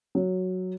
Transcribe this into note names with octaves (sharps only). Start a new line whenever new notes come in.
F#3